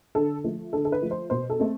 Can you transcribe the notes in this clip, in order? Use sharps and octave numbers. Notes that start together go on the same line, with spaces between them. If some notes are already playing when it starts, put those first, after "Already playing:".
D3 A4
F3 A3
D3 A4
A4
B4
F3 A3
C5
B2 C5
A4
A3 C4